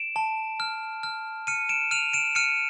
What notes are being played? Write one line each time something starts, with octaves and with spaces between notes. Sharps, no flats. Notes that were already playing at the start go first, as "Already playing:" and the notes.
Already playing: D7 E7
A5
F6
F6
F6 C#7 D#7
D7 E7
F6 D#7 F7
D7 E7
F6 C#7 D#7